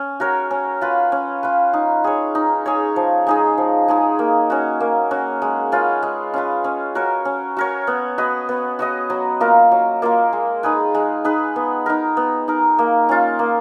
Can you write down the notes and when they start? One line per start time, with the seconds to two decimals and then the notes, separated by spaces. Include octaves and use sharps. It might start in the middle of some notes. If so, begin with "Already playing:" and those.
Already playing: C#4
0.20 F#4 A#4 C#5
0.51 C#4
0.81 F4 B4
1.12 C#4
1.43 F4 B4
1.73 D#4
2.04 G#4 C#5
2.35 D#4
2.66 G#4 C#5
2.96 F3
3.27 G#3 D#4 G#4
3.58 F3
3.88 G#3 D#4 G#4
4.19 A#3
4.50 C#4 F#4
4.80 A#3
5.11 C#4 F#4
5.42 G#3
5.72 C#4 F4 B4
6.03 G#3
6.34 C#4 F4 B4
6.64 C#4
6.95 F#4 A#4 C#5
7.25 C#4
7.57 F#4 A#4 C#5
7.87 B3
8.18 F#4 B4 D#5
8.49 B3
8.79 F#4 B4 D#5
9.10 F#3
9.40 A#3 F4 A#4
9.71 F#3
10.02 A#3 F4 A#4
10.33 G#3
10.63 D#4 G#4 B4
10.94 G#3
11.24 D#4 G#4 B4
11.56 B3
11.86 D#4 A#4
12.17 B3
12.48 D#4 A#4
12.79 A#3
13.09 C#4 F4
13.39 A#3